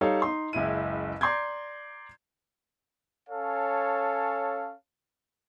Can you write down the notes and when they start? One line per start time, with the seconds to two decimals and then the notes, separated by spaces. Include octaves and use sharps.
0.01 G3 D#4 A4 C#5 F5
0.22 D#4 C6
0.53 F#1 C#2 E4 D#7
1.21 D5 A#5 C6 D6 G6 G#6
3.30 C#4 A4 C#5 F5 G#5 A5